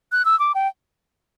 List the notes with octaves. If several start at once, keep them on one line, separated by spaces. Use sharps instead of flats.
F#6
E6
D6
G5